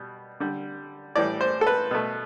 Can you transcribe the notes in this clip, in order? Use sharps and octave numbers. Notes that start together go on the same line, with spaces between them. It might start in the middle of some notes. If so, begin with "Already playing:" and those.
Already playing: B2 G3
D3 G3
A2 E3 G3 D5
C5
A4
B4
B2 A3